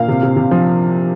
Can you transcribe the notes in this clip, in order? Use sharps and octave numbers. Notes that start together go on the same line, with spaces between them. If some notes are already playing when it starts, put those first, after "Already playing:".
Already playing: A#2 F5
C3
C3
C3
F3